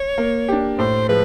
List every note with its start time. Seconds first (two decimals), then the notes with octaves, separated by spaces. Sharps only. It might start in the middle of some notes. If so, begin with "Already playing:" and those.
Already playing: C#5
0.18 A#3
0.48 D4 G4
0.79 A2 C5
1.09 F3 G#3 B4